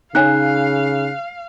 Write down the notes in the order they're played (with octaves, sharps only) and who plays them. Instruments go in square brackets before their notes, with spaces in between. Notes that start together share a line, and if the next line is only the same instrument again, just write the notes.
[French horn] C#3 [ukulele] D#4 C#5 G#5 [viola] F5 [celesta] F#6